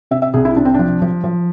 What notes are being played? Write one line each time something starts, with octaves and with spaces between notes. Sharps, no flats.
C3 E5
E5
C2 G#4
E4
C3 D4
C4
F3 D4
F3
F3